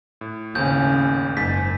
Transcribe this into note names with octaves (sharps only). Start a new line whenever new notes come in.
A2
G#1 D#2 A2 C#3 C#4 G6
F#1 G#2 G#5 A6 B6